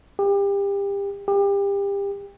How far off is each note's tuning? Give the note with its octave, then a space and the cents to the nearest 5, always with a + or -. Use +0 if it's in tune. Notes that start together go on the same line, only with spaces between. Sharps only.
G4 +30
G4 +30